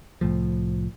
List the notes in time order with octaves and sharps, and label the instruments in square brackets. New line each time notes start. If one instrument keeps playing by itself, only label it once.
[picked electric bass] C2 A2 F3